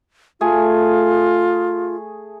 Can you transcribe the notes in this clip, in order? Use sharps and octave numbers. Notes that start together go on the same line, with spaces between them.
A3 F4 G#4 G#5